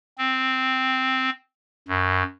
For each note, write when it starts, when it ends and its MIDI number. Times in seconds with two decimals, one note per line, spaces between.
0.18 1.30 60
1.88 2.23 42